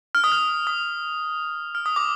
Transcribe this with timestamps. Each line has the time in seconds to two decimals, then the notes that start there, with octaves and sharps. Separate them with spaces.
0.15 F6
0.24 D#6
0.32 F6
0.67 D#6
1.75 F6
1.86 D#6
1.96 D6